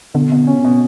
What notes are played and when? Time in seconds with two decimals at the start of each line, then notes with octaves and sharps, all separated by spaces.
0.14 B2 D3
0.32 B2
0.47 C#4
0.64 B2